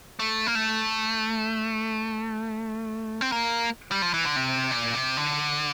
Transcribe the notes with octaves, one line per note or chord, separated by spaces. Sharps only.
A3
A#3
A3
C4
A#3
G3
F3
E3
D3
C3
A#2
C3
D3